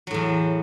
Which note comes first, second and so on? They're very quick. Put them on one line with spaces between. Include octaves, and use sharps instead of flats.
F#3 A2 E2